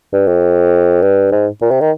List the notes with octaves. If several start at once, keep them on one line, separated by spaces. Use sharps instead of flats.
G2
F2
G2
G#2
A#2
C3
D#3